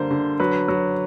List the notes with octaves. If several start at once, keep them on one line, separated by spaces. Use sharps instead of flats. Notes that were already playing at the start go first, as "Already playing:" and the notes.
Already playing: D3 G3 A#3 C5
D3
F#3 B4
F#3